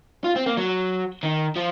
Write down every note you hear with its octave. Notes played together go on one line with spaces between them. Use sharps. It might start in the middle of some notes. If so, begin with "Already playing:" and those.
F4
C4
A#3
F#3
D#3
F3